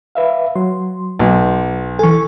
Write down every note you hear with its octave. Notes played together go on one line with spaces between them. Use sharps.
B4 E5 F5
F#3 C6
B1
E3 A4 G#5 C#6